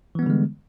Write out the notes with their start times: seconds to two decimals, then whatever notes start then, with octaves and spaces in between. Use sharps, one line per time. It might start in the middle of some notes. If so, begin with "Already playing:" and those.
0.15 E3
0.19 B3
0.23 G3
0.26 D3
0.30 G#3